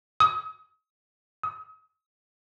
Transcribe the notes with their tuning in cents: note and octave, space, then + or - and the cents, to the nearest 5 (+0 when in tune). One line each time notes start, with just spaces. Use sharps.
D#6 +35
D#6 +40